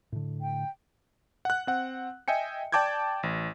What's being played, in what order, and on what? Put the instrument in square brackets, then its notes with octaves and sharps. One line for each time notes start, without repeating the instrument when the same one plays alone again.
[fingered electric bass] A2 D3
[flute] G5
[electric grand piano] F#5 F#6
C4 F#5
D#5 E5 G5 G#5 C#7
D5 G5 A5 D6 G6 G#6
A1